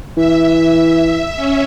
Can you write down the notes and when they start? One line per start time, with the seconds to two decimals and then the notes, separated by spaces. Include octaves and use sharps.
0.17 E3 E5
1.35 C#4